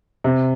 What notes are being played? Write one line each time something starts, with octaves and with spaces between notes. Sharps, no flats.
C3